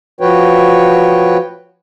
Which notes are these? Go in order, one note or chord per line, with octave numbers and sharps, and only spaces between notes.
F3 F#4 B4 C#5 G5